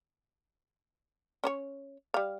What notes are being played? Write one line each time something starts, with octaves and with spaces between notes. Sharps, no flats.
C#4 C5 C#5
G3 F5